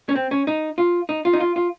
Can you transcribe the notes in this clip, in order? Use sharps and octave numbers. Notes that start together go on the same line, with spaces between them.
C#4
C4
C#4
D#4
F4
D#4
F4
D#4
F4
F4